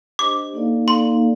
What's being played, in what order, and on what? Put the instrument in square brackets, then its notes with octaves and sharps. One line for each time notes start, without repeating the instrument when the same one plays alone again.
[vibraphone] D4 G4 C5 D#5 [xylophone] D6
[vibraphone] A#3 D#4 A4 D5 F5
[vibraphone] A#3 D#4 A4 D5 F5 [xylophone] C6